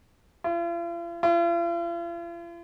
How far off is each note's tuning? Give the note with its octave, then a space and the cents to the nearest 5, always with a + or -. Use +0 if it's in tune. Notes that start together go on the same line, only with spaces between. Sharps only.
F4 -45
F4 -45